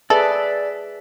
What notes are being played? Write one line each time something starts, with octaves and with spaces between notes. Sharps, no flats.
G#4 A4 B4 D5 E5